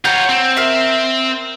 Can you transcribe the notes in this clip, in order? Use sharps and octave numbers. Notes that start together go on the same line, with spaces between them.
F4 C#5 F#5 A#5 G6
C4
A#4 E5